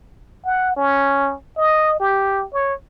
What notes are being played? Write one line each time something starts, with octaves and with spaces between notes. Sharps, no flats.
F#5
C#4
D#5
G4
C#5